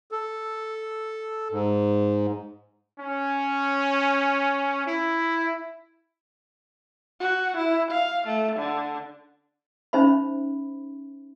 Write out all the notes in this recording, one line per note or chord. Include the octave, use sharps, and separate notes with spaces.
A4
G#2
C#4
E4
F#4
E4
F5
A3
D3
C#4 D#4 C5 E5 B5